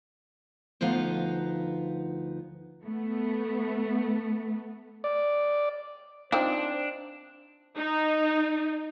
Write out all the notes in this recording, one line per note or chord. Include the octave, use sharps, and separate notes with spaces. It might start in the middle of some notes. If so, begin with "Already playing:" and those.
D2 F3 B3 D#4 F5
A3 B3
D5
C4 D4 D#4 F4 C5
D#4